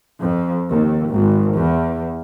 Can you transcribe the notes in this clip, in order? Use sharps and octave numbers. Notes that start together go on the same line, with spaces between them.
F2
D#2
G#1
E2